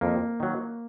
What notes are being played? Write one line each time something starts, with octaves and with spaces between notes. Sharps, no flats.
F2 A#3
D#3 F#3